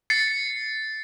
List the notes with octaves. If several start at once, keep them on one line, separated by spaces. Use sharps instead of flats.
A6 C7 C#7